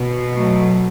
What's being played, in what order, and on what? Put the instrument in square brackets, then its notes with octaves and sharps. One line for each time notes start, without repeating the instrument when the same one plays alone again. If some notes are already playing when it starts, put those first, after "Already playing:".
Already playing: [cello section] B2
F#3 A3